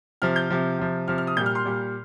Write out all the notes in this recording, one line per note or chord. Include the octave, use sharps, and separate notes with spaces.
C3 F3 F6
G6
C3 F3
C3 F3
C3 F3 F6
F6
D#6
A#2 G3 G6
F6
C6
A#2 G3